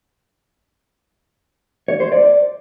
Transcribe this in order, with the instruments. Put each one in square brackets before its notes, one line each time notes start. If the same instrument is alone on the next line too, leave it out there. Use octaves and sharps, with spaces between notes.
[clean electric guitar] C#5
C5
D5